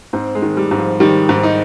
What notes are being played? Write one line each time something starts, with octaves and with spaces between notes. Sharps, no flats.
G#2 C4
G#3
D#3
G3
G#2
F3
D#3 G3
G#2
D#4